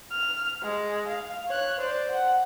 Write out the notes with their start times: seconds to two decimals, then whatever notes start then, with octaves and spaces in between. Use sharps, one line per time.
0.11 F6
0.63 G#3
1.08 F5
1.48 C#5 F#6
1.80 C5 D5
2.11 F#5